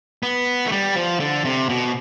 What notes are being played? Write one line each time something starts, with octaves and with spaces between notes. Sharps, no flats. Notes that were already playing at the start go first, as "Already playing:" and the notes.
B3
A3
G3
F3
D3
C3
B2